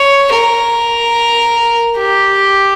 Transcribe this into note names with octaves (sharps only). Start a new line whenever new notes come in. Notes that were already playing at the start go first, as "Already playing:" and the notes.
Already playing: C#5
A#4
G4